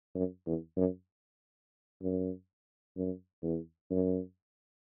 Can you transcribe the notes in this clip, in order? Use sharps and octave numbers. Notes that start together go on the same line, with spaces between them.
F#2
E2
F#2
F#2
F#2
E2
F#2